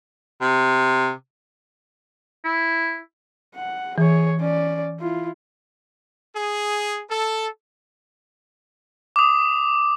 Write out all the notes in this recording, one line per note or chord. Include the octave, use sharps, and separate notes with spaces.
C3
E4
F#5
E3 G#4 C#5
C#4 D5
E4 F4
G#4
A4
D6 D#6